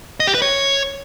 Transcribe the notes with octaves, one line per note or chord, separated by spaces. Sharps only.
D#5
G4
B4
C#5